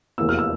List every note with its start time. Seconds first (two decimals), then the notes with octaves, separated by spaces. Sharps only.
0.18 F1 E2 E3 A#3 E6
0.29 F6
0.39 E6